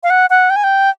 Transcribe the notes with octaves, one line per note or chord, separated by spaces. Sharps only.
F5
F#5
F#5
G5
G#5
G5